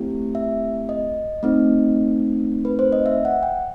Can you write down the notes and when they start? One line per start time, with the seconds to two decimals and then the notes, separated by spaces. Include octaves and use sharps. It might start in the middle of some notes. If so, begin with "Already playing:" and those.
Already playing: A3 C4 E4 G4
0.35 E5
0.89 D#5
1.43 A3 C4 D#4
2.65 B4
2.79 C5
2.92 D#5
3.06 E5
3.25 F#5
3.43 G5